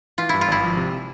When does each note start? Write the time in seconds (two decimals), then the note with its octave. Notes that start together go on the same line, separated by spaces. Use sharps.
0.18 E3 F4
0.29 G2 E4
0.41 F4
0.48 G#1 E4
0.63 F3
0.77 C3